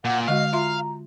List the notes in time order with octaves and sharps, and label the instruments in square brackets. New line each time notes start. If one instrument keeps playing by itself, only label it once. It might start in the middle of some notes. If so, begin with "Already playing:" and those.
[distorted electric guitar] A#2 [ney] F#5
[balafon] D3 G#3 F#4 [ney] D#5 [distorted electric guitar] F5
[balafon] F4 E5 C6 [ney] A#5